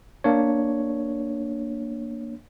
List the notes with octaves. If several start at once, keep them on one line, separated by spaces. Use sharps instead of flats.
A#3 D4 C#5